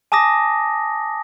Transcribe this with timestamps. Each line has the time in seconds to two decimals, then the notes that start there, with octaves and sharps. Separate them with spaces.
0.12 G#5 A5 D6 D#6 A#6